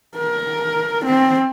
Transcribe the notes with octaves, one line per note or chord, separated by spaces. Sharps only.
A#4
C4